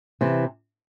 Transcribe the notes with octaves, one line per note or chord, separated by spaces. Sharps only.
C3 E3